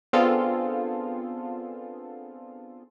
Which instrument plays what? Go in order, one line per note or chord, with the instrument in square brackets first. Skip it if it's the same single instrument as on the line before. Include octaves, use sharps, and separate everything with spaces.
[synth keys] B3 C4 D4 F4 G#4 A4